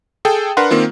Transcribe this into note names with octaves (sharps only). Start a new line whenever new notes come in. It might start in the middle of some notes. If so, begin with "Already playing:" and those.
G#4 A4 G5
D4 A#4 B4 F#5 C6
D#3 A#3 C4 F4